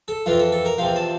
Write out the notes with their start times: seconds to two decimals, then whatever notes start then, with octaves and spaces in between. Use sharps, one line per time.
0.08 A4
0.26 F2 E3 F4
0.39 A4
0.52 A4
0.65 A#4
0.78 E2 C3 F3 F5
0.96 A5